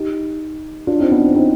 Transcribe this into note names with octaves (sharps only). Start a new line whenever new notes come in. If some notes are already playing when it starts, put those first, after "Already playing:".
Already playing: D#4 G4
D4 F4
C4 D#4
B3 D4
C4
C4 D#4